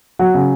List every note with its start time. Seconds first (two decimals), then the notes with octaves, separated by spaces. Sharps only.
0.19 F#3 F#5
0.34 C#3